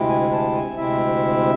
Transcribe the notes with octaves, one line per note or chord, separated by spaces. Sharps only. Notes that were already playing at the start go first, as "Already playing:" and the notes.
Already playing: D2 C3 G#3 C4 E4
G#5
A5
G#5
D2 C3 G#3 C4 E4 E5